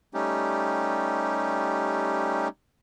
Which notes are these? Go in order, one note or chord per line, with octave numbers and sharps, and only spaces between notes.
G3 A3 C#4 D#4 G4